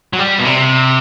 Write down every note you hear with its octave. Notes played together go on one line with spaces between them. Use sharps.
F#3
G3
B2
C3